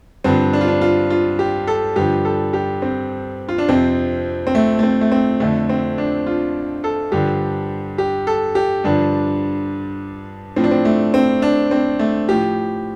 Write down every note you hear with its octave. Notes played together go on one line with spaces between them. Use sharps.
G2 D3 F3 C4
D4
F4
D4
F4
F4
G4
A4
G2 D3 F3 G4
A4
G4
C4
F4
D4
F2 C3 F3 C4
C4
A3
A3
C4
A3
C4
F2 D3 F3 A3
C4
D4
F4
A4
G2 D3 F3 G4
G4
A4
G4
G2 D3 F3 D4
A2 F3 C4
D4
C4
A3
C4
D4
C4
A3
A2 F3 G4